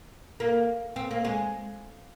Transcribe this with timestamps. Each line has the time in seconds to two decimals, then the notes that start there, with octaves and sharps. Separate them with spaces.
0.40 A#3
0.96 C4
1.11 A#3
1.25 G#3